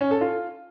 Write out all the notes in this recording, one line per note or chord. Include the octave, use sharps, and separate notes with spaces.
C#4
A4
F4